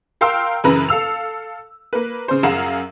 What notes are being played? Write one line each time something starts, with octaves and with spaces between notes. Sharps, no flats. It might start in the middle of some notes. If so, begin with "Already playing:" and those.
A#4 F5 G5 C6 E6
F#2 C#3 E3 B4 A#5 B5
A4 F5 E6 F7
A#3 B4
C#3 C5
F#2 G#4 F5 F#5 A#5 E7